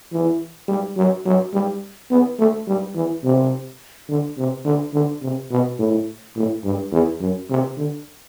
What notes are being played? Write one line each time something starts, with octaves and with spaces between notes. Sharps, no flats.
E3
G3
F#3
F#3
G3
B3
A3
G3
E3
C3
D3
C3
D3
D3
C3
B2
A2
A2
G2
E2
F#2
C3
D3